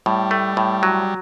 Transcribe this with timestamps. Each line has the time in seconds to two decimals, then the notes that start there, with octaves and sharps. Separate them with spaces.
0.06 A2 G3
0.31 A3
0.57 A2
0.83 F#3